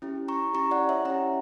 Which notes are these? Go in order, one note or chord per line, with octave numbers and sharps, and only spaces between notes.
C#4 E4 G4
A#5 C#6
C#4 E4 G4 A#5 C#6
D5 F#5
C#5 E5
C#4 E4 G4 F#5 A#5